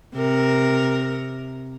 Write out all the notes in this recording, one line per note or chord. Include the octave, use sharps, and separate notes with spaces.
C3 A#4